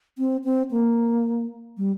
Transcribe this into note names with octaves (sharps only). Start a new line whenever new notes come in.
C4
C4
A#3
G3